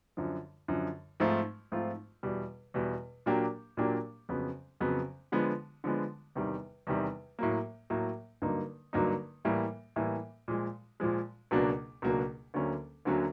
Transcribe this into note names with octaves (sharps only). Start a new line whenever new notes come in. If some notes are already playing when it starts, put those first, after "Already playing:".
F#2 D3 F3
F#2 D3 F3
G#2 F3 A3 C4 F4
G#2 F3 A3 C4 F4
E2 B2 G3
E2 B2 G3
A#2 F#3 A#3 D4 G4
A#2 F#3 A#3 D4 G4
F2 C#3 F#3 B3
F2 C#3 F#3 B3
D3 F3 G#3 B3
D3 F3 G#3 B3
E2 C3 D#3 G3
E2 C3 D#3 G3
A2 F#3 A#3
A2 F#3 A#3
G2 D3 F#3 A#3 D#4
G2 D3 F#3 A#3 D#4
A2 E3 G3 A#3
A2 E3 G3 A#3
A#2 F3 G#3
A#2 F3 G#3
C#2 B2 F#3 A#3 D4
C#2 B2 F#3 A#3 D4
D2 D3 F#3 A#3 C#4
D2 D3 F#3 A#3 C#4